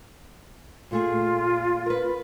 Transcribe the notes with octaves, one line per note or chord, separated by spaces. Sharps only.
A#2 A3 F4 G#4
A#4 B4